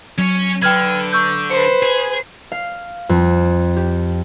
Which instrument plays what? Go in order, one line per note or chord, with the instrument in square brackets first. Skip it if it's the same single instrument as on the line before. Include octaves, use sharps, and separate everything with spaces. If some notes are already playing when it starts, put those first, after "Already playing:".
[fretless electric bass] F#3 [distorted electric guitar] C#4 C#5
[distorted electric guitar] D3 [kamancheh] B4 [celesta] G5 F6 G#6
[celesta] C#6 E6 G6
[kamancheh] B4 C5 [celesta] C#7
[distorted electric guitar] G#4
[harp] F5
F2
G4